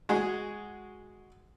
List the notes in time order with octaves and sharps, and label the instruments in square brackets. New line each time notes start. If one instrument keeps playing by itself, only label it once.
[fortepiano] G#3 F#4 G#4